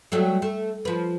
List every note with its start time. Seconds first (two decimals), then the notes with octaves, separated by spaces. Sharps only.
0.12 F#3 G3 A3
0.42 A3
0.85 F3 B4